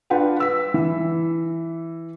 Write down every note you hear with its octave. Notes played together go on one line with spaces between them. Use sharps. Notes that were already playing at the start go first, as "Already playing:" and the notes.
D4 F4 B4 F#5 G5
E6 B6
E3